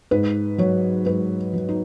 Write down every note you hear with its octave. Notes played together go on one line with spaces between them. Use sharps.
G#2 B4
F#3 C#5
G#2 B4
F#3
D#4